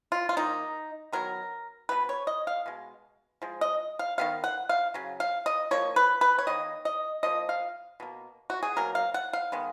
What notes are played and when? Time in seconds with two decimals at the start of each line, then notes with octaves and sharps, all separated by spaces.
0.12 F4
0.29 F4
0.37 D#3 A#3 D#4
1.12 D#3 F#3 B3 A#4
1.89 B2 G#3 B3 B4
2.09 C#5
2.27 D#5
2.47 F5
2.66 B2 G#3
3.42 F3 G#3
3.61 D#5
3.99 F5
4.18 D#3 G#3 B3 F5
4.44 F#5
4.69 F5
4.94 C#3 F#3
5.20 F5
5.46 D#5
5.71 F3 A#3 C#5
5.96 B4
6.21 B4
6.39 C#5
6.47 D#3 A#3 D#5
6.85 D#5
7.23 F3 A#3 D#5
7.49 F5
8.00 B2 A#3
8.50 F#4
8.63 G#4
8.76 B2 F#3 A#3 A#4
8.95 F5
9.14 F#5
9.33 F5
9.52 D#3 G#3 B3